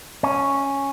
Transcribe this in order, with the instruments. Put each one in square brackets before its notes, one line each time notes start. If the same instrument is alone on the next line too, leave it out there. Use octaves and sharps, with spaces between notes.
[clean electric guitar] C#4